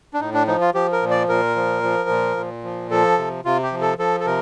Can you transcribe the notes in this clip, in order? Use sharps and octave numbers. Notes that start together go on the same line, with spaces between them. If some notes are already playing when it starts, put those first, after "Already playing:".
D4
A2 D#4
D4
F3 D#4
F4
F3 G4
A#4
A#2
D5
A#2 A#4
F3
F3
A#2
A#2
F3
F3 A4
C3
C3 F4
G4
F3
A4
F3 A4
A4
C3 A#4